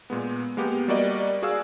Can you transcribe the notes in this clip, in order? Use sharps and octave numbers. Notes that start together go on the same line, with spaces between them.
A#2 G#3 B3
G#3 A#3 B3 G4
G3 A#3 F#4 A#4 D5 D#5
F#4 G#4 D5 F5 G#5 E6